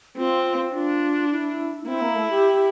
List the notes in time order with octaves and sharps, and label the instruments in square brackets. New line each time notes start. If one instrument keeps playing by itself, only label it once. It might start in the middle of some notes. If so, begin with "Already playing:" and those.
[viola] C4 [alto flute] F4
[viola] D4 [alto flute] F4
[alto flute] E4
A#3
[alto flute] C4 [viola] E4
[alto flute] A#3
A3
G4